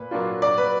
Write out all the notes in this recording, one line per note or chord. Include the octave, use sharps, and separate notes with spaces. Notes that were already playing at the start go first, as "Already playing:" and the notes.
Already playing: A#2 B4
F#3 A#3 D4 F4
F#3 D5
B4